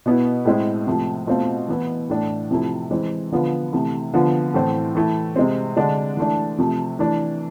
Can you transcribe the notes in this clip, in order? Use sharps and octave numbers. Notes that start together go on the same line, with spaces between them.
B2 B3 E4
A2 G#3 C4 E4
C3 F3 A3
B2 A3 C4 F4
E3 B3 E4
A2 E3 A3 D4
C3 F3 A3 E4
E3 G#3 C4
D3 F3 B3 F4
C3 E3 A3
D3 F3 B3 F4
A2 E3 A3 C4
E3 A3 E4
C3 G#3 C4
D3 G#3 D4
E3 A3 D4
C3 F3 A3
E3 A3 D4